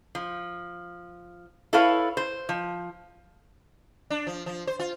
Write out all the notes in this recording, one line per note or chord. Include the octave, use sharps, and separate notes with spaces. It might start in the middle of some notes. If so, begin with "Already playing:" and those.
F3
E4 A4 B4 C#5 F5
C5
F3
D4
F3
F3
C5
F4